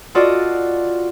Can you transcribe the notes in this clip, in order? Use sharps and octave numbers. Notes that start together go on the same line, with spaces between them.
F4 F#4 A4 D5 D#5